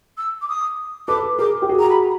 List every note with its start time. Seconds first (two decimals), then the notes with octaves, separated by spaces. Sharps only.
0.18 E6
0.41 D6
0.48 D#6
1.08 A4 B4 D6
1.38 G#4 A#4 D6
1.62 G4
1.69 F#4 G#4
1.79 A#5
1.89 B5